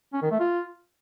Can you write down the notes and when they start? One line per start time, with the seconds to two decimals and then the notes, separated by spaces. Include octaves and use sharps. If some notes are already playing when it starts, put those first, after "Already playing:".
0.13 C#4
0.22 D#3
0.31 A3
0.40 F4